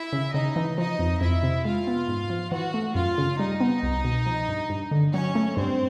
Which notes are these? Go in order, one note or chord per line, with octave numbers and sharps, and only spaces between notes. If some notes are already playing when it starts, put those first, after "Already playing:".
Already playing: E4 E5
C#3
C#3 D#4 D#5
E3
F3 D#4 D#5
F2
F2 E4 E5
C3
G#3 F4 F5
B3
G#2
F3
E3 F#4 F#5
A3
F#2 F4 F5
C#3
G3 D#4 D#5
B3
C2
B2
F3
G2
G2
D3
F#3 C#4 C#5
A3
G2 C4 C5